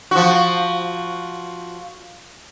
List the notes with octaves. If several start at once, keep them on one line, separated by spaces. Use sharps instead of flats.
F3 F#4